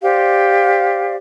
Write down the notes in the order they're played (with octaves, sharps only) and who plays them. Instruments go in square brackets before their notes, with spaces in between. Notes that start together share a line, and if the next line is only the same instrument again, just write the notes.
[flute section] G4 C5 D5 F5